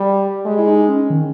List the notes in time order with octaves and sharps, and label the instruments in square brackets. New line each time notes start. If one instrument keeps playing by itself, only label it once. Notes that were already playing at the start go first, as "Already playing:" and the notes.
Already playing: [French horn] G3 [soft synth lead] G4
[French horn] G#3 [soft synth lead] G4
[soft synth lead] E4
D#4
C#4
D#3